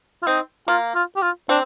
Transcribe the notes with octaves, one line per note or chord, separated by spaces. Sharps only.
F4
C4 D#4
A#3 F4
F4
G4
F4
C4 D4